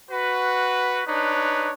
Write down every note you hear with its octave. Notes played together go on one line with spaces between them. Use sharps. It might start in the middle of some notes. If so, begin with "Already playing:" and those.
F#4 B4
D4 D#4 B4 C#5